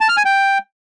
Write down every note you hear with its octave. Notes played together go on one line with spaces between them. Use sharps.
A5
F6
G#5
G5